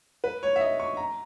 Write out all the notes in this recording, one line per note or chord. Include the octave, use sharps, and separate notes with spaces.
B4
C#5
E5
D#5
C#6
A#5